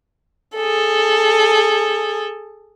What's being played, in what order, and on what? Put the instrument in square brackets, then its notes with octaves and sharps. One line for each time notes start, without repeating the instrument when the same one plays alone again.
[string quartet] G#4 A4